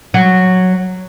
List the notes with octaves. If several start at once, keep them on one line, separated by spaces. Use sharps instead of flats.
F#3